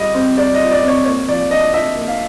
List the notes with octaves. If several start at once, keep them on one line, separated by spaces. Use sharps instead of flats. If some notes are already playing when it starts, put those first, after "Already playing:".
Already playing: G3 F4 D#5
C4
G3 D5
D#5
F4
D5
C4
C#5
A#3 C#5
F3 D5
D4 D#5
D4 E5
A#3
F5